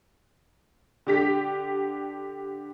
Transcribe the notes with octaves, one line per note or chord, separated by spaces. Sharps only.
D3 G4 B6